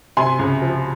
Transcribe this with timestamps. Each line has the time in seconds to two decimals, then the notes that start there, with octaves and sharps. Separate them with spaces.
0.17 C3 G#5 C6
0.39 C#2
0.62 F3